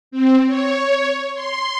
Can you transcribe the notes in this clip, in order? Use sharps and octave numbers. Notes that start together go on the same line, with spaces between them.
C4
C#5
C6